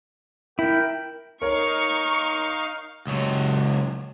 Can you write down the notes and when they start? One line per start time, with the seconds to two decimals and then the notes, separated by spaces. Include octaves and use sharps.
0.59 E4 A#4 G5
1.42 D#4 A#4 C#5 F5 C#6
3.07 C#2 F#3